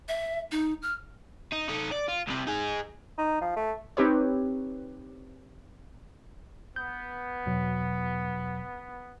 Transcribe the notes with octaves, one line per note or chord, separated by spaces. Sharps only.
E5
D#4
F6
D#4
D#4 A4
D5
F4
C2 C3
D#4 G#4
D#4
F3
A3
C4 D#4 G4 B4 C#5
B3 G6
E2 B2 F#3